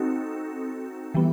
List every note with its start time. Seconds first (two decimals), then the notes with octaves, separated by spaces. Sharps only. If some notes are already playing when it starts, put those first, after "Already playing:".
Already playing: C4 D#4 F#4 A4
1.14 E3 G3 B3